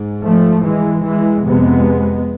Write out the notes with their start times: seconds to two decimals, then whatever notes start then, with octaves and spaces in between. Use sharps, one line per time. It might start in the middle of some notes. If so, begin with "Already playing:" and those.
Already playing: G#2
0.22 F3 A3
0.63 E3 G#3
1.04 E3 G#3
1.45 F2 C3 G#3 B3